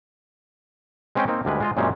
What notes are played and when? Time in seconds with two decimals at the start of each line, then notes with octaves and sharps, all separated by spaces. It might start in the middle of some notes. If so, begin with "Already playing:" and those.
1.15 G#3 C4 C#4 B4 D#5 G5
1.28 A#3 C4 D#4
1.45 D2 G3 G#3 B4
1.60 G#3 F4 D#5
1.77 F#2 A#2 G3 G#3 C4 C#4